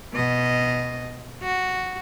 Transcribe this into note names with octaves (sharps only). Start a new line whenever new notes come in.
B2 D#5
F#4